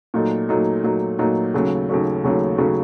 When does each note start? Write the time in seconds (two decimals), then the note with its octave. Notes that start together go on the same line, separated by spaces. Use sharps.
0.14 A#2 F#3 A3 D#4
0.49 A#2 F#3 A3 D#4
0.84 A#2 F#3 A3 D#4
1.19 A#2 F#3 A3 D#4
1.54 D#2 C#3 F#3 A3 C#4
1.89 D#2 C#3 F#3 A3 C#4
2.24 D#2 C#3 F#3 A3 C#4
2.58 D#2 C#3 F#3 A3 C#4